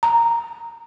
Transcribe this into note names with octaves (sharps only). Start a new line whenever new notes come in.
A#5